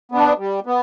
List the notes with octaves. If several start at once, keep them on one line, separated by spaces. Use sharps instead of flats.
B3 D4
G3
B3